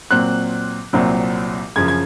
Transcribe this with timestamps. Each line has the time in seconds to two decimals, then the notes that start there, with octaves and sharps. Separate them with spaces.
0.11 A#2 F#3 C4 F#6
0.93 C2 A#2 F#3 C4
1.76 F#2 C#3 F3 G#6
1.88 G#6